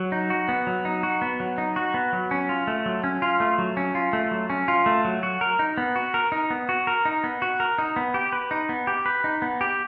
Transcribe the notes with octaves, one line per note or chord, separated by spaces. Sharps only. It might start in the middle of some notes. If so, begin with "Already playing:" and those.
Already playing: F#3
D#4
F#4
B3
F#3
D#4
F#4
B3
F#3
D#4
F#4
B3
F#3
C#4
F4
A3
F#3
C#4
F4
A3
F#3
C#4
F4
A3
F#3
C#4
F4
A3
F#3
F#4
A#4
D#4
B3
F#4
A#4
D#4
B3
F#4
A#4
D#4
B3
F#4
A#4
D#4
B3
G4
B4
D#4
B3
G4
B4
D#4
B3
G4